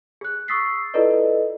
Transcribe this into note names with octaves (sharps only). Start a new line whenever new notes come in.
G#4 F#6
C#6 D#6 E6 A6 B6 C7
E4 F4 A4 B4 D5 D#5